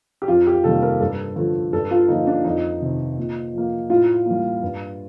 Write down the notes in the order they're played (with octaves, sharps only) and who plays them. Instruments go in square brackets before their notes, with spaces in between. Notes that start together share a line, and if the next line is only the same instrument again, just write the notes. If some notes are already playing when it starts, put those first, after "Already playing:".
[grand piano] G4
F2 F4
G4
C3 D#3 G3 A#3 A4
A#4
G2 A4
D3 F3 A3
G2 A4
F4
D3 F3 A#3 D#4
D4
F2 D#4
C3 D#3
A#2
F3 A#3
A2 F4
G3 A#3
G2